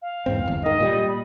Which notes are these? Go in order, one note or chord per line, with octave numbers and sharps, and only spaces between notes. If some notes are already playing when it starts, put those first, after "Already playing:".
F5
E2 G#2 C4
G1 E2
G#2 D#3 D#5
A#2 G3
B5